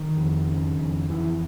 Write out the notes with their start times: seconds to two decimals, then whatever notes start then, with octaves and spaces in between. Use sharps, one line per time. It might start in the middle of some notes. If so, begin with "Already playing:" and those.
Already playing: D#3
0.17 F2
0.48 C#3
0.78 F2
1.10 F2 E3